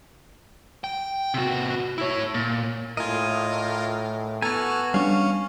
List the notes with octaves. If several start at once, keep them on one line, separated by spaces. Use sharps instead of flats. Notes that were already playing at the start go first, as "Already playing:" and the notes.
G5
C3 F#4
E4 C#5
A#2
A2 F4 A#4 D#5 G#5
B3 F#4 A4 G#5 A#5 F6
G3 C#4 D4 F5 C#6